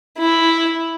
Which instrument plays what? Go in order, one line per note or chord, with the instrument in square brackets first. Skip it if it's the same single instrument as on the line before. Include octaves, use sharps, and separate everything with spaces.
[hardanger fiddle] E4